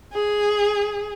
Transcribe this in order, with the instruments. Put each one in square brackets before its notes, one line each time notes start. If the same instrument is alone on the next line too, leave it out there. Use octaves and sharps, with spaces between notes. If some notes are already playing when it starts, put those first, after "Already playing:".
[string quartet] G#4